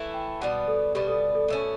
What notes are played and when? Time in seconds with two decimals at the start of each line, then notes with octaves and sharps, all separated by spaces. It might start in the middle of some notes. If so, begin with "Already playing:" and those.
Already playing: E3 A3 E4
0.14 G5
0.41 B2 G3 B3 F#5
0.68 A4
0.95 B2 G3 B3 G4
1.08 A4
1.35 A4
1.48 B2 A3 C#4 A4